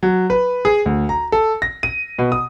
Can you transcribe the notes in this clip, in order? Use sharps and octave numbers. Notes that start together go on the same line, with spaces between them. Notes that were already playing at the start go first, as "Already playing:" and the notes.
F#3
B4
G#4
D2
A#5
A4
A#6
D#7
B2
D#6